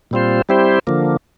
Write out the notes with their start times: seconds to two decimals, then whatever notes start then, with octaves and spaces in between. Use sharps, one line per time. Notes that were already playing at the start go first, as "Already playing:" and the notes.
0.11 A#2 G3 C4 F4 C5
0.49 G3 C4 E4 G4 C5
0.87 D3 F3 A#3